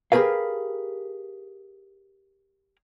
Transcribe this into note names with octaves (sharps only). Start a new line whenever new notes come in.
G4 G#4 A#4 B4 F5